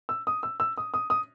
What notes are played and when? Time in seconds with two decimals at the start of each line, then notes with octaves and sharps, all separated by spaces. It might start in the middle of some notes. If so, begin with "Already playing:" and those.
0.09 E6
0.27 D#6
0.43 E6
0.60 E6
0.78 D#6
0.94 D#6
1.10 D#6